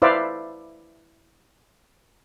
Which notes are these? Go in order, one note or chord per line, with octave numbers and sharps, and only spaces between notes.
E4 B4 C5 D5 E5 F5